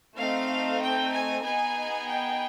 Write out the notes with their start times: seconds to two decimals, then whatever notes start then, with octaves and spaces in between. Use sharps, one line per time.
0.16 A3 C4 D#4 F5
0.80 G5
1.12 G#5
1.43 B3 D#4 G#4 G#5
2.06 G5